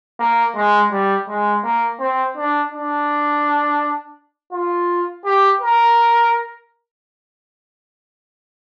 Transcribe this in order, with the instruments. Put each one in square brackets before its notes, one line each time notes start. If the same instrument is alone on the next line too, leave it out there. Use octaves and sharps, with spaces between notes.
[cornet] A#3
G#3
G3
G#3
A#3
C4
D4
D4
F4
G4
A#4